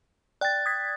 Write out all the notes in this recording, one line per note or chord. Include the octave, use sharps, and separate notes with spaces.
D5 G5 F#6 A6
D#6 G#6 B6